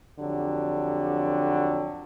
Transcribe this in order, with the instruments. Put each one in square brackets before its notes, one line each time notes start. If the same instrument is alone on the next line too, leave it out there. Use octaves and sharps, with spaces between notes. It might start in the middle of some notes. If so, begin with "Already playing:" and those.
[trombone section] F2 D3 F#3 G4